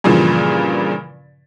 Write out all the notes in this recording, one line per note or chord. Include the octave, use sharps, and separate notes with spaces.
G2 A#2 C#3 E3 F3